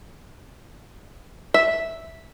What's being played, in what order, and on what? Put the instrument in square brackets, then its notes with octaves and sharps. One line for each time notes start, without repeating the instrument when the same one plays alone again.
[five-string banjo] E5